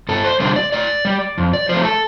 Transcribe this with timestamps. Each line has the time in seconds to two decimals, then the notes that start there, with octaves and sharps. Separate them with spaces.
0.09 G2 A4
0.24 C5
0.40 D3 G3 C5
0.56 D5
0.72 A2 D5
1.05 G3
1.38 F2
1.53 D5
1.69 F3 A3 C5
1.85 A4